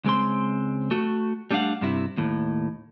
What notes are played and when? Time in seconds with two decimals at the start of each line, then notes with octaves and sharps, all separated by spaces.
0.05 C#2 G#3 C4 C6
0.91 A3 F#4
1.51 G3 A3 D4 D5 F5 F#5
1.81 G2 C3 E4
2.17 D#2 A2